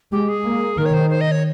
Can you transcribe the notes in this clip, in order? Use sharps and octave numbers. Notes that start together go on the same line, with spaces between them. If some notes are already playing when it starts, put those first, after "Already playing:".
G#3 G4
G#4
A#3
D#3 A#4
C#5
C5
C5
D#5
C#5